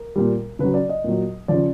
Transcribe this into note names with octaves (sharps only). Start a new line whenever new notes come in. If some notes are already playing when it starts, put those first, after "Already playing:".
Already playing: A#4
A#2 G3
C#3 F#3 B4
D5
D#5
A#2 F#3
C#3 F3 D5